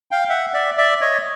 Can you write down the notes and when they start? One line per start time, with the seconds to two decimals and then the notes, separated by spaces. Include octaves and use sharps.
0.11 F5 G5
0.29 E5 F#5
0.54 D5 E5
0.77 D5 E5
1.01 C#5 D#5